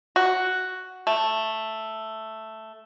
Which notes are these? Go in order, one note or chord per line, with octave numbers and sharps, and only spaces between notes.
F#4
A3